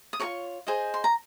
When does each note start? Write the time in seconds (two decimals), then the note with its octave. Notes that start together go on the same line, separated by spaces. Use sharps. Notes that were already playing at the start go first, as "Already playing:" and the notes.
0.13 D#6
0.20 F4 A#4 C#5 C#6
0.67 G#4 C5 D#5
0.94 C6
1.04 A#5